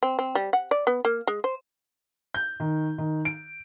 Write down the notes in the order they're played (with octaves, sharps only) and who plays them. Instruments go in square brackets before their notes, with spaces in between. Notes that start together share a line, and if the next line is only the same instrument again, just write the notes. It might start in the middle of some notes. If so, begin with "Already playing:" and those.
[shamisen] C4
C4
G3
F#5
D5
B3
A#3
G#3
C5
[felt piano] G6
D#3
D#3
D7